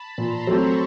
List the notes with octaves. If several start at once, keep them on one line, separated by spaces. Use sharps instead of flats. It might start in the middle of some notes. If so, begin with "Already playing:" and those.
Already playing: A5 B5
A#2 A#5 C6
F#3 A3 C4 B5 C#6